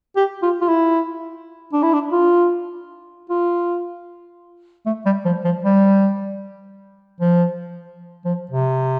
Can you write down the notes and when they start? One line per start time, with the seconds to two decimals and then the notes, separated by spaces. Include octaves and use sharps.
0.16 G4
0.42 F4
0.61 F4
0.69 E4
1.73 D4
1.83 E4
1.93 D4
2.12 F4
3.30 F4
4.86 A3
5.06 G3
5.25 F3
5.45 F3
5.64 G3
7.20 F3
8.25 F3
8.51 C3